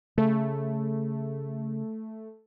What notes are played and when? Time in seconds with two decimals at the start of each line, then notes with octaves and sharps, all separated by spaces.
0.18 C#3 A3